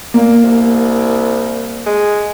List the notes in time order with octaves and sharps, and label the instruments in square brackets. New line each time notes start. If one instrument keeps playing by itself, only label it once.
[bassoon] A#2 [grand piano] A#3
[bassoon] C2
G#3